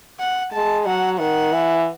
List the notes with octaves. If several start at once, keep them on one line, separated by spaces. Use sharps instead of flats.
F#5
G#3 A5
F#3 F#5
D#3 F#5
E3